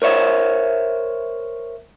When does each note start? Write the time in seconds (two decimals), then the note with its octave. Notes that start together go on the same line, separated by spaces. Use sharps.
0.02 A#4 C5 C#5 E5